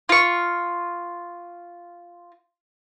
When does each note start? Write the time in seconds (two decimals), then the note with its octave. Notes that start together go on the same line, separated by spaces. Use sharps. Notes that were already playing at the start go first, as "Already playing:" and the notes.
0.09 F4 C#6